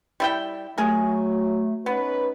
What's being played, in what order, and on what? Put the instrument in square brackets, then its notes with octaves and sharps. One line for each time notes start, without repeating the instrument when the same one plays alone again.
[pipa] G3 E4 G5
[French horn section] F#3 [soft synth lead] A3 [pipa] G#4 A#4
[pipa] B3 [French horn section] C#4 D#4 B4